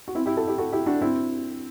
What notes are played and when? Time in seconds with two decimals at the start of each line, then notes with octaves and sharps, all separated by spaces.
0.08 F#4
0.15 C4 E4
0.26 E4 G4
0.36 F#4 A4
0.48 E4 G4
0.58 F#4 A4
0.72 E4 G4
0.86 D4 F#4
1.02 C4 E4